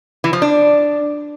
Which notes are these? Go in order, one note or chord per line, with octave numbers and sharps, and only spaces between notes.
E3
F3
D4